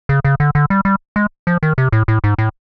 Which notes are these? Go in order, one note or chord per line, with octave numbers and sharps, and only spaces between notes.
C#3
C#3
D3
D3
G3
G3
G#3
F3
D#3
C3
A2
A2
G#2
A2